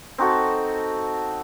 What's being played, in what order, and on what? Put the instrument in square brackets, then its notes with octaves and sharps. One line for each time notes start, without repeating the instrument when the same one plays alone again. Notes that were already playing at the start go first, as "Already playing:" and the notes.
[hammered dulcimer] C4 D#4 F#4 A4